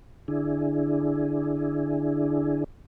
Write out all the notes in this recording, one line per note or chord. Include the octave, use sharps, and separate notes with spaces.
D3 D4 E4 G#4